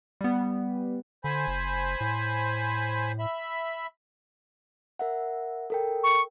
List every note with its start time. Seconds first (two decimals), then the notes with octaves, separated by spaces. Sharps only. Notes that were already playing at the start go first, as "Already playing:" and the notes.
0.21 G3 B3
1.24 D3 C5 G#5 B5
1.47 F#1
2.01 A2
3.19 E5 B5
4.99 A#4 E5 F#5
5.70 A4 A#4 G5
6.03 C#6